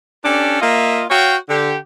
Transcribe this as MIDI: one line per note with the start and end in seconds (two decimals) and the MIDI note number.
0.25 0.58 61
0.25 0.58 62
0.25 0.58 67
0.25 0.58 69
0.61 1.04 58
0.61 1.04 65
0.61 1.04 75
0.61 1.04 76
1.10 1.35 66
1.10 1.35 73
1.10 1.35 77
1.10 1.35 79
1.49 1.75 50
1.49 1.75 67